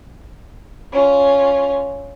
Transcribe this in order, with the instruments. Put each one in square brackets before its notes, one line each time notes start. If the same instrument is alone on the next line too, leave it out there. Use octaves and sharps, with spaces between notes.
[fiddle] C#4 F4